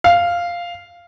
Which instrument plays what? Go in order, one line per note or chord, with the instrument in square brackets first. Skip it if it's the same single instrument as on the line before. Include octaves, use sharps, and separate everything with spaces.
[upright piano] F5